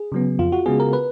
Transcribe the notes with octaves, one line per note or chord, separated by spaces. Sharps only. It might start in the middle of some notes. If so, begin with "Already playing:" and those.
Already playing: G#4
C#3 F#3 B3
F2 F4
F#4
C#3 G#3 B3 G#4
A#4
B4